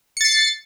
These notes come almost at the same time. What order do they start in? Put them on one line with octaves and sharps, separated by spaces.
C#7 A6 C7